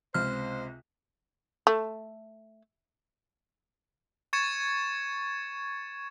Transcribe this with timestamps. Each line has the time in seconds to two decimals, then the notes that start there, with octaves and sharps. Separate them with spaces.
0.14 C#2 C3 C5 F6
1.67 A3
4.33 C#6 G#6 A6 C#7 E7